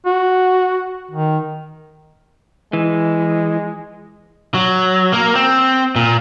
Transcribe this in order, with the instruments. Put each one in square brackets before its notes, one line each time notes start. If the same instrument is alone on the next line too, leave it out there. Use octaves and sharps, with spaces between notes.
[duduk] F#4
D#3
[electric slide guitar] E3 [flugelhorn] G#3
[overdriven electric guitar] F#3
A#3 A#4
C4
A#2